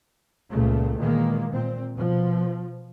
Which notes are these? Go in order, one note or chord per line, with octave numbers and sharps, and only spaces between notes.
C#2 A#2 C#3 A3
A#2 D#3 E3 G#3 A#3
A#2 C4
B2 F3